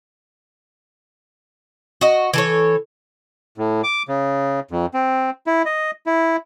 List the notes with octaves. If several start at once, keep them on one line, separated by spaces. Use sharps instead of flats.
F#4 D#5
E3 A4 C#5
A2
D6
C#3
F2
C4
E4
D#5
E4